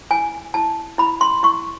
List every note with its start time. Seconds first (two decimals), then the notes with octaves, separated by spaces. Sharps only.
0.11 E4 G#5
0.54 E4 A5
0.98 E4 B5
1.21 C6
1.43 E4 C#6